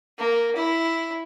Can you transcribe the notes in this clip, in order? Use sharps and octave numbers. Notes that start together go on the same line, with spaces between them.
A#3
E4